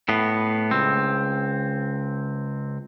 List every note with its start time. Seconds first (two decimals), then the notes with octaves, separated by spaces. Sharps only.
0.09 A2 B3
0.71 C#2 C4